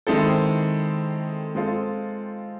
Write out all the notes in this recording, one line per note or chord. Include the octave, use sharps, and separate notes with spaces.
D#3 G#3 C4 E4 A4
G#3 C4 F4 A4